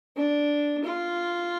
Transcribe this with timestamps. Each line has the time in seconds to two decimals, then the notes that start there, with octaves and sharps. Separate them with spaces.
0.16 D4
0.84 F4